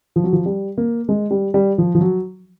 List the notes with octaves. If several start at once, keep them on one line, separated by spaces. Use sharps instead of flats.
F3
F#3
F3
G3
A#3
G#3
G3
G3
F3
F3
F#3